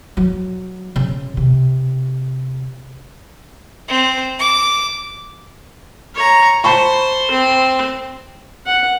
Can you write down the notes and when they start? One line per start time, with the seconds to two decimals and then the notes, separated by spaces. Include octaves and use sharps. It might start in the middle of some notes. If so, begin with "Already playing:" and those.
0.17 F#3
0.96 C#3
1.37 C3
3.88 C4
4.39 D6
6.15 C#5 A#5
6.64 C5 A5 B5 C#6
7.31 C4
8.66 F#5